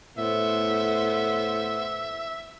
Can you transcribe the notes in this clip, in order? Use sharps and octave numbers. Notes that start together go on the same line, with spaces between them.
A2 B3 C5 E5